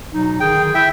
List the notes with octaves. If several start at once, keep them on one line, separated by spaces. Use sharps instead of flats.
B2 F#3 D#4
D3 D#3 G#4 G5
E4 E5 G5